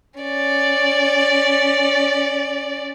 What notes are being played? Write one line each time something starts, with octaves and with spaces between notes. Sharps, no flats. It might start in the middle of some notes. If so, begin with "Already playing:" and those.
C#4 D5